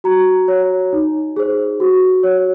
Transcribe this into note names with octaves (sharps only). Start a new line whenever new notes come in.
F#4 A#5
C#5
D#4
G#4 C5
F#4
C#5